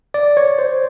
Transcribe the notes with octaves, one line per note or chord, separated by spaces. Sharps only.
D5
C#5
C5